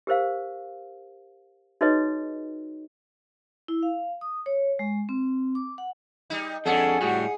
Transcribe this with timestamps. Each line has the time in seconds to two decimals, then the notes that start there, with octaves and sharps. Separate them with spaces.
0.07 G4 A#4 C5 F5
1.81 D#4 F#4 G#4 B4 C#5 D#5
3.68 E4
3.83 F5
4.21 D#6
4.46 C#5
4.79 G#3
5.09 C4
5.55 D6
5.78 F#5
6.30 G3 D#4
6.66 F2 C#4 D4 G#4 A4 F#5
7.01 A2 G3 F#4 G#4